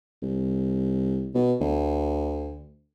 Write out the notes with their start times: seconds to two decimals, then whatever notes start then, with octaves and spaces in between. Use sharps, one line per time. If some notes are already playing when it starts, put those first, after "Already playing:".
0.23 C2
1.35 B2
1.61 D2